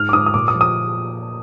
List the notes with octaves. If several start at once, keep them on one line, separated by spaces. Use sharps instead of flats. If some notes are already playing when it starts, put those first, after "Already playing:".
Already playing: G#2 F6
D6
G#2 D#6
D#6
A#2 D6
D#6
F3
D#6